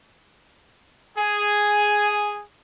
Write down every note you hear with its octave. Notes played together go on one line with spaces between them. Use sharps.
G#4 G#5